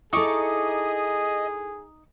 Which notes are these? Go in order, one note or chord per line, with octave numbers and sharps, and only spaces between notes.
D#4 E4 G#4 A4 D#5 C#6 D6